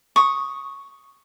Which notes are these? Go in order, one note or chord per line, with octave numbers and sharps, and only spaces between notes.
C#6 D#6